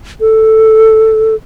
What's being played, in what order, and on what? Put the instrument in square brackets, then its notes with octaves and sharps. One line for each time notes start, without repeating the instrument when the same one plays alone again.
[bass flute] A4